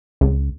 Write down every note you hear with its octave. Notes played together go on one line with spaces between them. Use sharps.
C#2